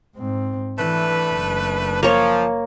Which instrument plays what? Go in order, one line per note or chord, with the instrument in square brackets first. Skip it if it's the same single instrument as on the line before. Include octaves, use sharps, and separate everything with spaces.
[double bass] G#2 C4
[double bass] E3 [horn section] A3 D4 B4
[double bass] F#1
[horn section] F3 [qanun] A#3 C#5